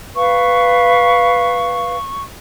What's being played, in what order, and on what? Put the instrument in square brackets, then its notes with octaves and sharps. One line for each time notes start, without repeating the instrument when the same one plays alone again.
[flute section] B4 F5 [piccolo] C#6